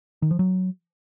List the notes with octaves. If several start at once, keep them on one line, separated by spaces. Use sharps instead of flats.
D#3
F3
F#3